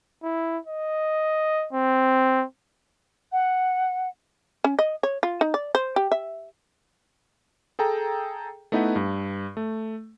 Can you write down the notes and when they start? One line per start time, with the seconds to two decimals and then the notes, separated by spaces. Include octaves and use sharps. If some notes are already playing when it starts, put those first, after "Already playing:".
0.23 E4
0.67 D#5
1.73 C4
3.32 F#5
4.64 C#4
4.79 D#5
5.03 C#5
5.23 F4
5.41 D#4
5.54 D5
5.75 C5
5.96 G4
6.12 E5
7.79 G#4 A4 G5 A#5
8.72 A3 B3 D#4 E4 B4 F#5
8.96 G2
9.57 A3